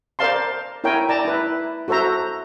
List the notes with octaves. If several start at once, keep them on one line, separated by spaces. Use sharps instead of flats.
A#4 C5 D5 F5 A5 C6
E4 A#4 C#5 G5 G#5
D5 A5 A#5
E4 B4
F#4 A4 C5 E5 A#5